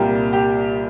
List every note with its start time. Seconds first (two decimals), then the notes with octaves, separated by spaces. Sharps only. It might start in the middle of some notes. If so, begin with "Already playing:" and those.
Already playing: C2 A#2 G3 A#3 G4
0.33 G4